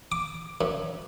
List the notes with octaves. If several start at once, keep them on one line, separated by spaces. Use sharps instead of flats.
D6
F#2